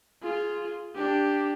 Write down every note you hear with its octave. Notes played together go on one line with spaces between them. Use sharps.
F4 G#4
D4 G4